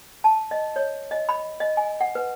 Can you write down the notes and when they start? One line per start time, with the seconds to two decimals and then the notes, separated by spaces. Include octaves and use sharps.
0.24 A5
0.51 D#5
0.76 C#5
1.11 D#5
1.29 B5
1.60 D#5
1.77 G#5
2.01 F#5
2.15 B4